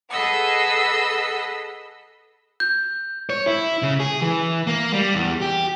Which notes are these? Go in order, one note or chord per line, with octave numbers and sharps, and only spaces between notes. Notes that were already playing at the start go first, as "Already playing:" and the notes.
G#4 A4 B4 D#5 F#5 E6
G6
C#5
E4
C#3
G#4
E3
A#3
G3
E2
G4